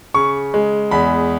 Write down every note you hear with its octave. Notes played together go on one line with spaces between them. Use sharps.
C#3 C#6
G#3
E2 B5